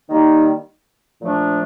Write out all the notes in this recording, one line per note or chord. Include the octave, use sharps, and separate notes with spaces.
D#3 G3 A#3 D#4
A#2 F3 A3 D4